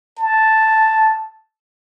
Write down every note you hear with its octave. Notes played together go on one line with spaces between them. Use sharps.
A5